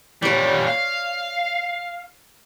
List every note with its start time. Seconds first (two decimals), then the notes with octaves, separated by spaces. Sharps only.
0.22 A#2 G3 C#5 D5
0.67 F5